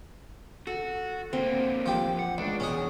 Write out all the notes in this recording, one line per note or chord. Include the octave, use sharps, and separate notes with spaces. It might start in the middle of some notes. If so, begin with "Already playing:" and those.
F#4 A4
D3 A#3 C4
F3 G4
F#5
C#2 D4
E2 B2 C#4 G#4